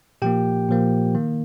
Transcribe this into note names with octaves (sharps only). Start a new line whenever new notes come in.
A#2 F3 A#3 G4 G5
A#2 F3 A#3
D#3 A#3